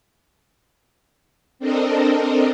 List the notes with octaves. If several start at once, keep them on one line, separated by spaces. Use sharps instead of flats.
C4 D4 A4 A#4 D#5